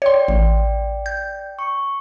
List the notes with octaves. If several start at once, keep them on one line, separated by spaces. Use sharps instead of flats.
C#5 D5 G5 C6
A1
G6
C#6